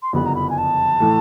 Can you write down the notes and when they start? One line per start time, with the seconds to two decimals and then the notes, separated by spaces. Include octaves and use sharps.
0.02 C6
0.13 F#1 F2 D3 G3 B3 B5
0.25 A#5
0.35 B5
0.49 G#5
0.57 A5
1.00 A2 E3 A3